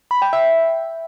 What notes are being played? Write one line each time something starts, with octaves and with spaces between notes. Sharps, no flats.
B5
G5
E5